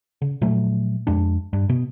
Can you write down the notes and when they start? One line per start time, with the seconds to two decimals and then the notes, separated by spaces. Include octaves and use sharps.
0.22 C#3
0.42 A#2 F3 F#3 A3
1.07 F2 G#3 D4
1.53 G2
1.69 B2 B3